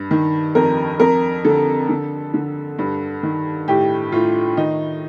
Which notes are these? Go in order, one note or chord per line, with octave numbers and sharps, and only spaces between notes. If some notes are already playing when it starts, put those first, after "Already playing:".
Already playing: G2
D#3
F2 A#4
F2 A#4
D3 A4
D3
D3
G2
D#3
A2 G4
A2 F4
D#3 D#4